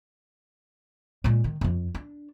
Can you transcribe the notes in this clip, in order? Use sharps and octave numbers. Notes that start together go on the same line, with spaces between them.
A#2 G#3
D#3
E1 F2
D4